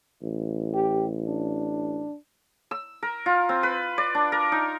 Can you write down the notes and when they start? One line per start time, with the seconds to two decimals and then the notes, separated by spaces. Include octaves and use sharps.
0.22 A1
0.74 G4
1.27 D4
2.71 E6
3.03 A#4
3.26 F4
3.49 C4
3.63 B4
3.98 D5
4.15 D4
4.32 A#4
4.52 D#4